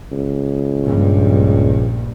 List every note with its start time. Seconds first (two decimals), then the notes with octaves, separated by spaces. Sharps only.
0.12 C#2
0.83 A#1 G2